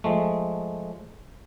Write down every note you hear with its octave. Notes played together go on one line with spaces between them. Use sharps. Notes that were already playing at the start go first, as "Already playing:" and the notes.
F3 G#3 A3